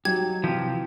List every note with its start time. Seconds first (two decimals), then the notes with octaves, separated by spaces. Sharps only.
0.05 F#3 D#4 G4 G#6
0.44 C3 E3 F3 G4